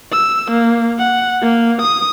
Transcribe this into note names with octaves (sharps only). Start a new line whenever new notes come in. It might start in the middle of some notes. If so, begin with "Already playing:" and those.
E6
A#3
F#5
A#3
D#6